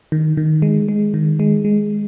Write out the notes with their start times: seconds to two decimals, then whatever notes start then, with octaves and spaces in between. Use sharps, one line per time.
0.12 D#3
0.37 D#3
0.62 G#3
0.89 G#3
1.14 D#3
1.40 G#3
1.65 G#3